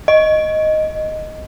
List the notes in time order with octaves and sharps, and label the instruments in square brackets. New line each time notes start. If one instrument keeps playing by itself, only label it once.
[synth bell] D#5